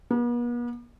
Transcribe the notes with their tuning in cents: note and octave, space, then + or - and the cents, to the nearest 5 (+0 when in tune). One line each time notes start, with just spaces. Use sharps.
B3 -45